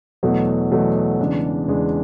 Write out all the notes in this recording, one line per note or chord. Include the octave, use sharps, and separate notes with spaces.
E2 B2 F#3 A3
E2 B2 F#3 A3
E2 C#3 G#3 D4
E2 C#3 G#3 D4